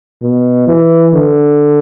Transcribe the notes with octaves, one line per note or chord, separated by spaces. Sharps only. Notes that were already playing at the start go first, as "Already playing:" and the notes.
B2
E3
D3